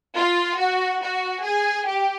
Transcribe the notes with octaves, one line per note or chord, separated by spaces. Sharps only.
F4
F#4
F#4
G#4
G4